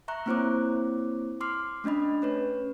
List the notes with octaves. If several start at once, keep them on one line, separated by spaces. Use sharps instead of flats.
E5 A#5 C#6 F#6
A#3 C4 E4 C5 C#5 D6
C6 D6 F6 C7
A3 C#4 D4 D#5 B5
C#4 B4 C#5